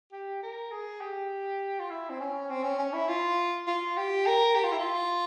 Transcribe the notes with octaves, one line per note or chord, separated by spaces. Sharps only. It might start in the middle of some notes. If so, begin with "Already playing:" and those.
G4
A#4
G#4
G4
F4
E4
C4
C#4
C4
C#4
C#4
E4
F4
F4
G4
A#4
G4
F4
E4
F4